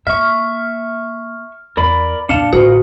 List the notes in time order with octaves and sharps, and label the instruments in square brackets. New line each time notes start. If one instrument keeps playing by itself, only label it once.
[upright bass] A#3 [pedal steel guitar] E5 C#6 [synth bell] F6
[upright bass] E2 [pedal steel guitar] A#4 D5 B5
[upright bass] F2 A#2 [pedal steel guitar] D4 F5 A5 [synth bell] C#7
[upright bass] A1 D3 [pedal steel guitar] F4 A#4 F#5 [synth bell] F#4